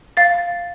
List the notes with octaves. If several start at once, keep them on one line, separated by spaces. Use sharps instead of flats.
F5 A6